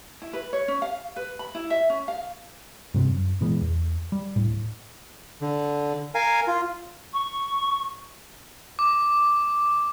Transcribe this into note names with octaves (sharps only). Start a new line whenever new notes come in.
E4
B4
C#5
C#4
F5
B4
B5
E4
E5
C#4
F5
G2 C3 C4
F#2
A#2 E3 G#3 B3
E2
G3
D#1 A2
D3
A#4 F5 G#5
F4
C#6
D6